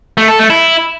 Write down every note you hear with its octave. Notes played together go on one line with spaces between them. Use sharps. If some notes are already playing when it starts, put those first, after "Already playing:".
A3
A4
A3
E4